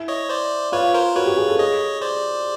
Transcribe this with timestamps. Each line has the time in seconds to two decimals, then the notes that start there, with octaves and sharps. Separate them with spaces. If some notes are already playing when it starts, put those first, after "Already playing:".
Already playing: E4
0.08 C#5 D#5
0.29 C5 D5
0.72 F4 B4 C#5
0.94 A#4 C5
1.16 F#4 B4 C#5
1.26 G4
1.38 G#4
1.48 A4
1.59 G#4 C#5 D#5
2.02 C5 D5